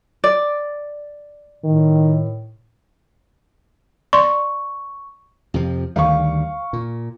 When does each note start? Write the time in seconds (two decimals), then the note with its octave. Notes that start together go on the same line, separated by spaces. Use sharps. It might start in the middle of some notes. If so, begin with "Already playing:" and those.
0.24 D5
1.64 A2 D#3
4.13 D5 C6 C#6
5.54 F2 C3 F3
5.96 D2 D#3 G3 F5 C#6
6.73 A#2